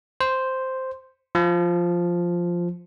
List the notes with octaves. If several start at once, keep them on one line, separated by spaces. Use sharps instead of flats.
C5
F3